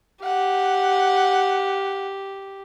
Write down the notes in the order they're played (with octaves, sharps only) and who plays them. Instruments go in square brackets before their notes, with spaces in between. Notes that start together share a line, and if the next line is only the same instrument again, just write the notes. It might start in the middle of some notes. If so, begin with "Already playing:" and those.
[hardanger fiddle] G4 [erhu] F#5